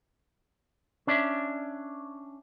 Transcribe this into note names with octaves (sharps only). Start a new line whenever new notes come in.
C#4 D4 D5 E5